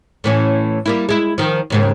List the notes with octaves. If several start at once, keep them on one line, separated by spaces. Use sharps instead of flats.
A2 E3 C#4
G3 A#3 E4
G#3 E4
D#3 F3
D#2 G#2 C#3